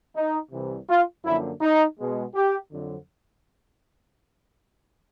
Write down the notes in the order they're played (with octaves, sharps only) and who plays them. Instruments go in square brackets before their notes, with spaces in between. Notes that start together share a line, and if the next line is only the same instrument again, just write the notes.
[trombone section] D#4
C2 C3 E3
F4
F#2 D3 F3 A#3 E4
D#4
B2 G#3 B3
G4
F2 D3 F#3